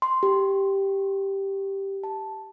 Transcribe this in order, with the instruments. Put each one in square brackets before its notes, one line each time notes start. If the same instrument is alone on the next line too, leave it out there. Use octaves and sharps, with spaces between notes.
[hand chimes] C6
G4
A5